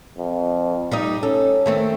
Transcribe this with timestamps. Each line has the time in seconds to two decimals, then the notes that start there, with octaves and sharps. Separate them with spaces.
0.18 F2
0.92 G3 D#4 D#5
1.23 C#4 A4
1.66 D#3 A3 C4